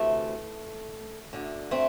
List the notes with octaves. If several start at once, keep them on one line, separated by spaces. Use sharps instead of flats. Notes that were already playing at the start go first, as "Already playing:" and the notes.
Already playing: D2 C3 E3 A3
D2 D3
A3 C4